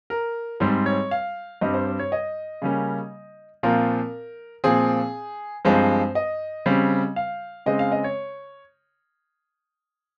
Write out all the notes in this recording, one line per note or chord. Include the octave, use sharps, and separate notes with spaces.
A#4
G#2 G3 C4 C5
C#5
F5
G2 G3 C4 D#5
C5
C5
C#5
D#5
C#3 G3 A#3 C#4
A#2 F3 C4 A#4
A#2 F3 C4 G#4
G2 F3 G#3 C4 C5
D#5
C#3 G3 C4
F5
C#3 G#3 C4 D#5
F5
D#5
C#5